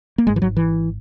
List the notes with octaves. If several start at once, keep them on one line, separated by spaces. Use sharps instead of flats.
A#3
G#1 G#2 G#3
E3
F#3
E3